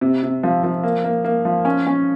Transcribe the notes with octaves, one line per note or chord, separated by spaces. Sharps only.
C3
C3
F3
F3
A#3
A#3
A#3
F3
C#4
C#4